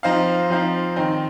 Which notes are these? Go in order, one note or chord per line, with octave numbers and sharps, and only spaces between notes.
F3 C4 D#4 C5 F5
F3 C4 D#4 C5 F5
D#3 C4 D#4 C5